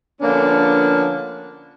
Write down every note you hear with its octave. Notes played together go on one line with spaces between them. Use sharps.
D3 F3 A#3 B3 C#4 D4